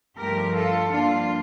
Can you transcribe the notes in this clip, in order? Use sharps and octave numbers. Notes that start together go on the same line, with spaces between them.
G2 F3 A3 G4 A#4
F4 A4
G2 F3 A#3 D4 F4